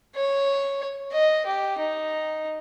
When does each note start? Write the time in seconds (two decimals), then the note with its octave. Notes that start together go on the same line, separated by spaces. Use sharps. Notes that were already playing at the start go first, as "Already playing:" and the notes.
0.15 C#5
1.12 D#5
1.46 G4
1.78 D#4